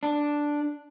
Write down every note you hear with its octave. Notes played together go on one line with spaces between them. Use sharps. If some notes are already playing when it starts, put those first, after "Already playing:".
D4